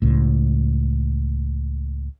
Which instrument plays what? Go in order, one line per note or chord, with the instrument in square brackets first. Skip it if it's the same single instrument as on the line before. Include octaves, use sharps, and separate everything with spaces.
[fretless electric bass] C#2 A2